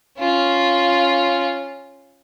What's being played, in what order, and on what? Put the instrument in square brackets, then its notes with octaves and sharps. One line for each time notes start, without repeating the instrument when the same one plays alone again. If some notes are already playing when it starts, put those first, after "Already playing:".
[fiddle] C#4 F4